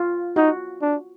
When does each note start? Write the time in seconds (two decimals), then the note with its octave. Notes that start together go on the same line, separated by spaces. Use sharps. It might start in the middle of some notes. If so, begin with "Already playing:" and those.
Already playing: F4
0.36 D#4 F#4
0.82 D4